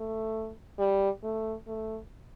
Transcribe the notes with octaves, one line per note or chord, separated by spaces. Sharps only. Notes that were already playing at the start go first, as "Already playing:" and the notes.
Already playing: A3
G3
A3
A3